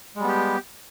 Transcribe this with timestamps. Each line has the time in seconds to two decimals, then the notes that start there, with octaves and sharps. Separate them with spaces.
0.15 G#3
0.20 G3
0.24 B3
0.28 G4